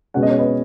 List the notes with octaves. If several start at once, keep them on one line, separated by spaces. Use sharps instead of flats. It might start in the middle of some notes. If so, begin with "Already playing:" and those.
B2 G#3 C#4 F#5
D#5
C#5
B4 D#5